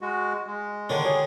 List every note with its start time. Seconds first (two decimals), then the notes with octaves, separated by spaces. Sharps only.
0.01 G#3 F#4
0.47 G#3
0.90 D3 D#3 D4 C#5
1.05 G4 G#4 C#5